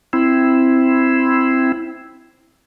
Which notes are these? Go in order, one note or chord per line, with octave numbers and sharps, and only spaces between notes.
C4 E4